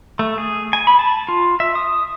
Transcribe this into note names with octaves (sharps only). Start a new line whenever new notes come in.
A3
G#4
G#5
B5
A5
F4
E5
D#6